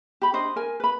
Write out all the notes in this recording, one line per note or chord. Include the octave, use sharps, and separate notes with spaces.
G4 B5
D4 C5 D#5
A#4 G#5
B4 B5